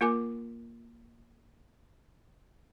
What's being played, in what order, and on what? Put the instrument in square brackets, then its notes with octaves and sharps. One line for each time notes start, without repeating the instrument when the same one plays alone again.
[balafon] A#3 F4 A#4 G#5 D6